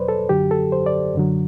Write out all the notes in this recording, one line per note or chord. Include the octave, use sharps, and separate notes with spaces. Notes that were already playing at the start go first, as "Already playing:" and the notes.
Already playing: E2 B2 F#3 B4 C5 D5
A4
F#2 D3 F#3 G4
A4
C5
D5
F#2 D3 F#3